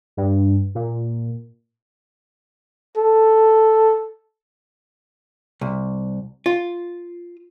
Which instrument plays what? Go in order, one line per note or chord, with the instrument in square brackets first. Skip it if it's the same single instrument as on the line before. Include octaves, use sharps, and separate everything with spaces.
[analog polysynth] G2
A#2
[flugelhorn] A4
[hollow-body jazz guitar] C2
F4